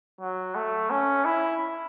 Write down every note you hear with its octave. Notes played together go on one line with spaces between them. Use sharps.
F#3
A3
C#4
E4